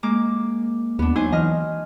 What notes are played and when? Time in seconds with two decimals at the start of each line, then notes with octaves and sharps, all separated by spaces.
0.03 G#3 A#3 D6
0.99 D#2 B3 D4
1.16 F#3 D#4 C5 G#5
1.32 E3 D#5 F6